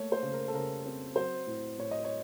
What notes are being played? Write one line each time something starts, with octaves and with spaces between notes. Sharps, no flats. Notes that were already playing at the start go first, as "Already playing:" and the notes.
Already playing: A3 A#3 C#5
C5
C#3
A#4
A4
C#3 A#4
C4
F#3 C5
A2
A2 C#5
D#5
C#5